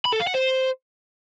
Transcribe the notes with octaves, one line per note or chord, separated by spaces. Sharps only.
B5
A4
F5
F#5
C5